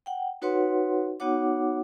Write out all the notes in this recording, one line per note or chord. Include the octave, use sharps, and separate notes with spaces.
F#5 G5
D#4 F#4 B4 C#5 F#5 C6
B3 D#4 F#4 C#5 F#5 D6